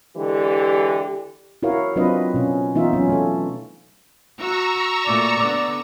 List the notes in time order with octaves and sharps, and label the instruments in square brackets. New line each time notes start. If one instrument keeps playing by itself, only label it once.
[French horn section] D3 E3 G#3 G4
[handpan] E4 F#4 A#4 C#5 F5
F#3 C4 D4 F4 B4 D#5
B2 C#4
E3 B3 D#4 F4 E5
F#3 C#4
A3 A4
[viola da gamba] F#4 [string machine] A#5 C#6 E6
[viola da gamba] A#2 A3 [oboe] D5
[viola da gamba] D3 B3 [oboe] D5